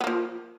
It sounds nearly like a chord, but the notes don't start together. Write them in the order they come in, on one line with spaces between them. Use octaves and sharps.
B3 A#3 F3